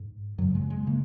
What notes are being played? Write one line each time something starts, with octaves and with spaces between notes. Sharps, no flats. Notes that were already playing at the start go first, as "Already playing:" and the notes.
Already playing: G#2
F#2 C#3 F#3
G#3
G#3
C#3 A#3